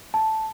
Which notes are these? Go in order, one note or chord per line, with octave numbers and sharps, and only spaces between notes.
A5